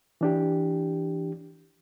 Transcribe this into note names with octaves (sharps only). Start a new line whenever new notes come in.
E3 D4 G4